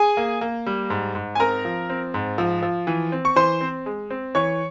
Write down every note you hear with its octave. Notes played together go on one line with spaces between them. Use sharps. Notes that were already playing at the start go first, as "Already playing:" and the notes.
Already playing: G#4 G#5
A#3
A#3
G3
G#2
G#2
G#5
C4 A#4 A#5
F3
C4
G#2
F3
F3
E3
C4
C#6
E3 C5 C6
C4
G#3
C4
E3 C#5 C#6